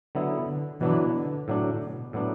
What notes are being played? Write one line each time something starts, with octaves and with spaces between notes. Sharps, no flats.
D3 F#3 B3 E4
D3
B2 E3 F#3 D4
D3
A2 F#3 D4
B2
A2 F#3 B3 D4